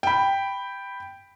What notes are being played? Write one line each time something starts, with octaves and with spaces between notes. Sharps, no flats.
G5 B5